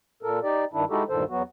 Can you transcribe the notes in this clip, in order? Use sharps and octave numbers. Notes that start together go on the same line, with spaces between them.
A#2 A4 A#4
D#4 G4 D5
G2 D#3 D4 E4
G#3 D#4 E4 F#4 G4 A4
D2 G2 A#2 D#3 A4 C5
E2 F#3 B3 F#4